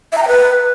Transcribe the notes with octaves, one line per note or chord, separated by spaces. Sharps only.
E5
A#5
G5
B4